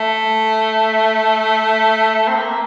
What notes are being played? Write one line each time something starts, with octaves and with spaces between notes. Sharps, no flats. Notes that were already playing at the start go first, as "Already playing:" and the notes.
Already playing: A3
C4
A#3